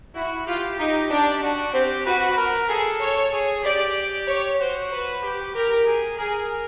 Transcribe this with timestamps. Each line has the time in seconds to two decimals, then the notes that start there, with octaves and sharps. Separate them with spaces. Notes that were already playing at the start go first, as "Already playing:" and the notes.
0.15 E4 F#4
0.46 F4 G4
0.79 D#4 G4
1.10 D4 G4
1.42 F#4
1.73 C4 G4
2.06 F#4 B4
2.37 A#4
2.69 G#4 A4
3.01 C#5
3.33 G#4
3.63 G4 D5
4.28 C#5
4.59 F#4 C5
4.91 B4
5.23 G4
5.54 G4 A#4
5.86 G#4
6.17 G#4 A#4